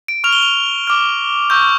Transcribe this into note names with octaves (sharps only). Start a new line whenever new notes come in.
D7
C#6 F6 F7
G7
F7
D6 F6
C#6 E6 G6